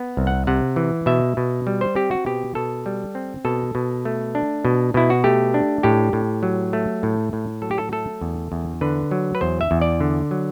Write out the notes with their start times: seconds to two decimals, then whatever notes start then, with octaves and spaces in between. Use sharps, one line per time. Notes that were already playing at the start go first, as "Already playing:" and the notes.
Already playing: B3
0.17 C2
0.27 F#5
0.47 C3 F#5
0.76 E3
1.06 B2 E5
1.37 B2
1.67 G3
1.81 C5
1.96 C4 G4
2.11 F#4
2.26 B2 G4
2.55 B2 A4
2.86 G3
3.15 C4
3.45 B2 A4
3.75 B2
4.05 A3
4.35 D4
4.65 B2
4.94 B2 E4
5.10 F#4
5.24 A3 G4
5.54 D4
5.83 A2 G4
6.13 A2
6.43 F#3
6.73 A3
7.03 A2
7.33 A2
7.62 F#3 A4
7.71 G4
7.78 A4
7.92 A3 A4
8.21 E2
8.52 E2
8.81 D3 B4
9.11 F#3
9.35 B4
9.41 E2 C5
9.61 E5
9.71 E2
9.82 D5
10.00 D3
10.31 F#3